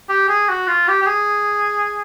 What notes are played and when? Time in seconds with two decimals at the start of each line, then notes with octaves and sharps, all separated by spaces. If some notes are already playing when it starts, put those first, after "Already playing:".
0.09 G4
0.29 G#4
0.49 F#4
0.68 F4
0.88 G4
1.02 G4
1.07 G#4